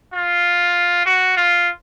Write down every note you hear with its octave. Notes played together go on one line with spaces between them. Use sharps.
F4
F#4
F4